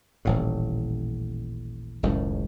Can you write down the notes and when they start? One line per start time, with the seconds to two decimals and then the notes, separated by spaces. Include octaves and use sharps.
0.25 D#1 A1 A2
2.03 F#1 C#2 A2 D#3